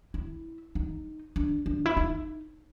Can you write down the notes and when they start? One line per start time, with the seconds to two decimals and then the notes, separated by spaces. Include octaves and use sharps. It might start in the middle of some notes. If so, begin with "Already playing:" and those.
0.14 E4
0.75 D#4
1.36 D4
1.66 D4
1.86 E4
1.97 D#4